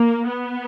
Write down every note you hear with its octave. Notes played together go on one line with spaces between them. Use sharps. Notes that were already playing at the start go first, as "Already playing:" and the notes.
Already playing: A#3
B3